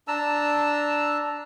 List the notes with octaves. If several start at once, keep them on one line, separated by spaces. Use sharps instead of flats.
D4 A5 A#5 E6